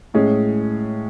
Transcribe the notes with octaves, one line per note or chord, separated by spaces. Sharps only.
A2 G#3 C#4 G#4